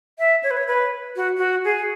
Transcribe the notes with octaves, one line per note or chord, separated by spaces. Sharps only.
E5
C#5
B4
C#5
B4
F#4
F#4
G#4